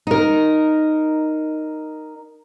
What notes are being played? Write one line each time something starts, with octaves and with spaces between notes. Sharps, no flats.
D#4 A#4